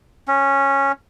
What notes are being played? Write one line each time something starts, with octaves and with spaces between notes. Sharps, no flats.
C#4